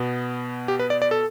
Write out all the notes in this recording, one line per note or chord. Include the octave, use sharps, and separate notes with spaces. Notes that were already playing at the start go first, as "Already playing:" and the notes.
Already playing: B2 B3
G4
B4
D5
D5
A4